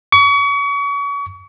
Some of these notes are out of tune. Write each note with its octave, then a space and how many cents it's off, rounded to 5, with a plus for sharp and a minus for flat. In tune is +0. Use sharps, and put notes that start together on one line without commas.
C#6 +35